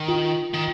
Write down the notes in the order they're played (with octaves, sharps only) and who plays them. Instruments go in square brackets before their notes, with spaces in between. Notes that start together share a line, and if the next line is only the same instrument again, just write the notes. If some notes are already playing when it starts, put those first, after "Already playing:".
Already playing: [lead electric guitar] D#3
[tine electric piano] F4
[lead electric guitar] D#3